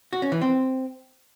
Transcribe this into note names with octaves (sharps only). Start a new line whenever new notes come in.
F#4
C#4
E3
C4